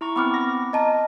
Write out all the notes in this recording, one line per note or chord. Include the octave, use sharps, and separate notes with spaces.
E4 A#5 C#6
B3 C4 B5 D6 F6
A#6
D#5 A5 A#5